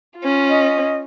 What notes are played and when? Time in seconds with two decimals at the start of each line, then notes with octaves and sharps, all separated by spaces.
0.18 C#4 F4
0.49 D#5